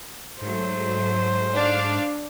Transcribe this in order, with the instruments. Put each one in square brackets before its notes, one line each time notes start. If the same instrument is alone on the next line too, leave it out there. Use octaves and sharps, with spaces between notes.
[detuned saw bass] G#2 [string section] F#3 A3 [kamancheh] C5
[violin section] D4 F5